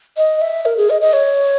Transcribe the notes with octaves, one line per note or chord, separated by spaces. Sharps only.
D#5
E5
A#4
G#4
D#5
D#5
C#5